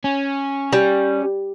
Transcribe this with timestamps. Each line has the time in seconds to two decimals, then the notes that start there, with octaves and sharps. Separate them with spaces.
0.04 C#4
0.73 G3